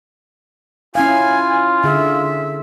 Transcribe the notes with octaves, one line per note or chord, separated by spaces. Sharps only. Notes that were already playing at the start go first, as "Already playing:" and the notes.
C#4 E4 F4 F5 G#5
D3 G#4 E5